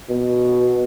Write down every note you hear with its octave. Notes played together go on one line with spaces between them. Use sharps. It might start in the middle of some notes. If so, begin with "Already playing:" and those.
B2